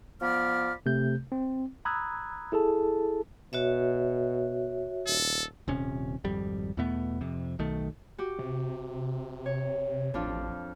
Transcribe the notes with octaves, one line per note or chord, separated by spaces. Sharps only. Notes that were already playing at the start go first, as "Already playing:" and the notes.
F3 B3 D5 B5 F6
C3 A3 G6
C4
A#5 B5 D#6 E6 F#6 G#6
E4 G#4 A4 A5
B2 F#4 C#5 E5
D#1 A4
D#1 C3 C#4
G#1 F2 G3
E2 B2 A3 B3
F2 C3
B1 D#3 A3
F#4 G4
C3
C#5
A1 F2 D4 F4